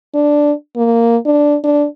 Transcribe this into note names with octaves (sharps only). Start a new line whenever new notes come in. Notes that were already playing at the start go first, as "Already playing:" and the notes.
D4
A#3
D4
D4